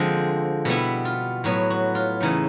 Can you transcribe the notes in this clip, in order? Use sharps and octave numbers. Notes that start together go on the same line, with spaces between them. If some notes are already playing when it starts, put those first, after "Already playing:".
Already playing: D3 F3 G#3 C4 D4
B2 G3 B3 E4
F4
A2 F#3 B3 F#4
F#4
F4
C#3 E3 A3 D#4